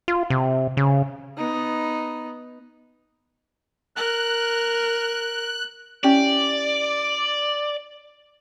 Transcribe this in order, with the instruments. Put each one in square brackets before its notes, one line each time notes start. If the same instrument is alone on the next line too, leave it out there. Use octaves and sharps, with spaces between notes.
[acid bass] F4
C3
C#3
[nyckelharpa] B3 D#4
[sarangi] A#4 [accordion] F#6
[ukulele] C#4 E4 G4 [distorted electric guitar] D5